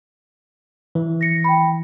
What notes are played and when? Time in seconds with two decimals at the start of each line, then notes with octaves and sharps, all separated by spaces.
0.95 E3
1.21 A#6 C#7
1.44 G5 B5